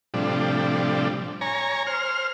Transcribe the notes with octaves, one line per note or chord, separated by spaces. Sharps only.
A2 C3 F3 G3 D4
C#5 G#5 A#5
C5 F6